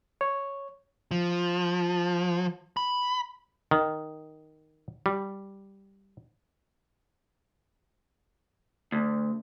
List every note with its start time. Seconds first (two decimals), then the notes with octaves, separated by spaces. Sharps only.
0.21 C#5
1.11 F3
2.77 B5
3.71 D#3
5.06 G3
8.92 D2